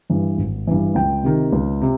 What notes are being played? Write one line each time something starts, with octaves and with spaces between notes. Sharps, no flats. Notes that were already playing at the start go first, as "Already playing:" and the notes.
G2 E3
G#1
G2 E3
C#2 G5
C3 D#3
C#2
C3